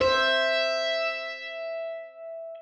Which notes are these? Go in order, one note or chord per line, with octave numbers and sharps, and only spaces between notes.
C5 E5